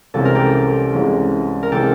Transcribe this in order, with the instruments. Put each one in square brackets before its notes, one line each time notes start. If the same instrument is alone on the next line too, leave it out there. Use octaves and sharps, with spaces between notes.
[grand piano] C2 C3 E3 G#3 C#4 [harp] A4
[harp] A#4
G4 A4
[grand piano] C2 C3 E3 G#3 C#4
[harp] A#4
[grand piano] C3 E3 G#3 C#4 [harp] G4 A4